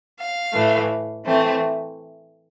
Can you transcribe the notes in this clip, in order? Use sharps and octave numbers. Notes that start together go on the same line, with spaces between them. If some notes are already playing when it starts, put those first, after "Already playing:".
F5
A2 E3 A3
E3 A3 C4